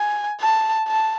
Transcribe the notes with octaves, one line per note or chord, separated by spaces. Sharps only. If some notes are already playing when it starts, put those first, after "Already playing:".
Already playing: G#5
A5
A5